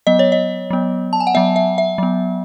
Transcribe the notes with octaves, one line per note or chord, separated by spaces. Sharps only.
F#3 B3 D#5
C#5
D#5
F#3 B3
A5
G#5
F#5
F#3 B3 E5
E5
E5
F#3 B3